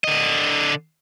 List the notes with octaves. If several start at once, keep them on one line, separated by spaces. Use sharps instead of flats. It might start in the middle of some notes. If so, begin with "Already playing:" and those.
D3 D#5